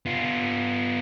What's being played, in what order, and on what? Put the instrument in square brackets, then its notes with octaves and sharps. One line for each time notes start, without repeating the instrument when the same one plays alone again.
[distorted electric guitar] B3 F4